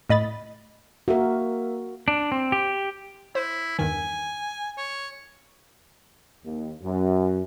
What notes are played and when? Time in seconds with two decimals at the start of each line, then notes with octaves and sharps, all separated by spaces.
0.10 A2 D#5 B5 A6
1.08 A#3 F#4 A#4 E5
2.08 D4
2.32 C4
2.52 G4
3.35 E4 C5
3.79 E2 G2 D#3 G#5
4.78 C#5
6.44 D#2
6.81 F#2